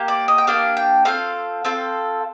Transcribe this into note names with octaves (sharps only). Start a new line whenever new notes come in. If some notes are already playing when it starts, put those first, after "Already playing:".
Already playing: A#3 G4
D5
D#5
G5
A#3 D4 G4 F5
G5
C4 F4 A4 F5
C4 F4 A4